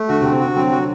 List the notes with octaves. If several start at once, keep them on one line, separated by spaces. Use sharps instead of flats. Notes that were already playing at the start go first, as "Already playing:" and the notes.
Already playing: A3
D3 F#4
C3
C4
C3
D3 F#4
F#3 C4
F#4